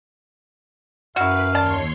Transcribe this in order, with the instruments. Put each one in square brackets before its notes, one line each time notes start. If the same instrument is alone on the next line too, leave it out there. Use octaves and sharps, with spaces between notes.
[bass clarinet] F#2 [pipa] E4 F#4 [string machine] B4 [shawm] F5
[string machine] D#2 C#5 C6 [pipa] D5 A5